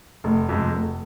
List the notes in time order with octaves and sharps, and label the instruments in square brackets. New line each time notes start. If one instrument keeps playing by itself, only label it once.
[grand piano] F1 [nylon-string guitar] A3
[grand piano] F2 C3 G#3
[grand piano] F1 [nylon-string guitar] A3